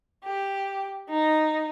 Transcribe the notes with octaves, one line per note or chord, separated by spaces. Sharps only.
G4
D#4